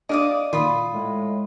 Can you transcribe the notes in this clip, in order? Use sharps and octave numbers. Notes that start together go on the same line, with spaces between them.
D4 A4 D5 D#5 F5 D#6
A#2 D#3 F4 B5 D#6
A2 G#3